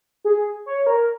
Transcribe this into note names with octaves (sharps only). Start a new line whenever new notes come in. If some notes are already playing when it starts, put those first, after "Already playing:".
G#4
C#5
A#4